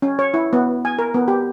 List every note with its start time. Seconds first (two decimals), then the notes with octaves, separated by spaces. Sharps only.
0.02 C#4
0.19 C#5
0.34 E4
0.53 B3
0.85 G#5
0.99 A#4
1.14 B3
1.28 G4